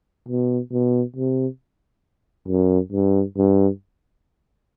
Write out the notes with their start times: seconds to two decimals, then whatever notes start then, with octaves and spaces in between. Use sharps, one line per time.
0.29 B2
0.72 B2
1.17 C3
2.48 F#2
2.92 G2
3.37 G2